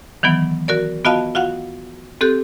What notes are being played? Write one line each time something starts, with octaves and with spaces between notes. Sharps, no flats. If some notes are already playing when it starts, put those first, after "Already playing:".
D#3 E3 F#3 B3
F#4 A#4 D5
B3 F4 F#4 D#5 F5 A5
F4 F#4 F5 F#5
C4 G4 A4 F#6 G6